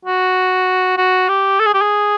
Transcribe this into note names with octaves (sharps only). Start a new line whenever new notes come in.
F#4
F#4
G4
A4
G#4
G4
G#4